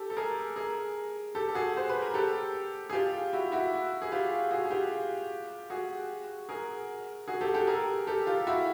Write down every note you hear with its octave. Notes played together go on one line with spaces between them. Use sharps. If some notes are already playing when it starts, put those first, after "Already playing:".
Already playing: G4 A4
A4
G#4 A#4
G#4 A#4
G4 A4
A4
F#4 G#4
C5
B4
A#4
G4 A4
G#4
F4 G4
E4 F#4
E4 F#4
G#4
F4 G4
F#4 G#4
G#4
F4 G4
F#4 G#4
G#4 A#4
F#4 G#4
G4 A4
G4 A4
G#4 A#4
G4 A4
F4 G4
E4 F#4